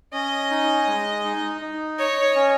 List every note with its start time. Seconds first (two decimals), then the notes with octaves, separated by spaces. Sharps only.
0.13 C#4 D#5
0.50 D#4
0.87 G#3
1.24 D#4
1.61 D#4
1.98 C#5 D#5
2.35 C#4